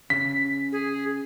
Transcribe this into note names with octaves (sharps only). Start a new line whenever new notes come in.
C#3 B6
G#4